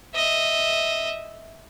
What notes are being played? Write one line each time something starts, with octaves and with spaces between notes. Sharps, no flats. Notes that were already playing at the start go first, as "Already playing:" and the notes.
D#5 E5